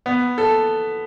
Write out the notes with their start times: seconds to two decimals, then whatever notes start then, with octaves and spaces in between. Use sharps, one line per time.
0.06 B3
0.38 A4